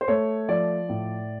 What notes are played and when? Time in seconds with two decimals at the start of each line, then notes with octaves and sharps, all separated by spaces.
0.01 C5
0.08 A3 C#5
0.48 F3 D5
0.89 A2